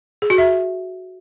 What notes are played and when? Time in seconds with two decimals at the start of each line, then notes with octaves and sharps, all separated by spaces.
0.22 G#4
0.30 F#4
0.38 E5